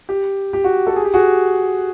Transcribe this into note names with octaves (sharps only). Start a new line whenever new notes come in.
G4
G4
F#4
A4
G#4
G4
F#4 G#4